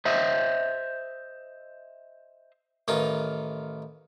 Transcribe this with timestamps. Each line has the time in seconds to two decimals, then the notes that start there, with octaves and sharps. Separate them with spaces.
0.05 C5 D#5 E5
2.88 A1 D#3 D#4 F4